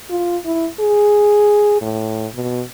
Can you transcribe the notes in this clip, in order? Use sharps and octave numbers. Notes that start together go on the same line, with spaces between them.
F4
E4
G#4
A2
B2